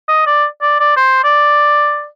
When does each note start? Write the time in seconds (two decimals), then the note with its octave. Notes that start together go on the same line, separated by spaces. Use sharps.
0.09 D#5
0.26 D5
0.62 D5
0.80 D5
0.96 C5
1.24 D5